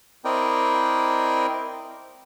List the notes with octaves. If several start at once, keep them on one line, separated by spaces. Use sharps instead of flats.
C4 E4 A#4 D5 D#5 G5